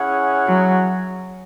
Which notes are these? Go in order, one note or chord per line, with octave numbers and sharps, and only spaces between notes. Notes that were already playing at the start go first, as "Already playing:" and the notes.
Already playing: C#4 E4 G#4 C#5 F#5
F#3